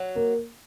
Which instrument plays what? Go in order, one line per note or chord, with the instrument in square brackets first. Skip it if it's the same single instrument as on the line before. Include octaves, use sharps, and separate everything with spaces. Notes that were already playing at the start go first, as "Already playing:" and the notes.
Already playing: [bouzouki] F#3
[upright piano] A#3